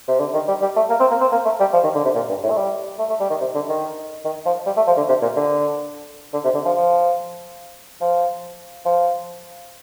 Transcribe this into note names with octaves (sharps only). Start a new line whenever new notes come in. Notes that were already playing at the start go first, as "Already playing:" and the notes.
C3
D3
D#3
G3
G3
A3
A#3
C4
A#3
C4
A#3
A3
G3
F3
D#3
D3
C3
A#2
G2
A2
A3
G3
A3
A3
G3
D#3
C3
D3
D#3
D#3
F3
G3
A3
F3
D3
C3
A#2
D3
D3
C3
D3
F3
F3
F3
F3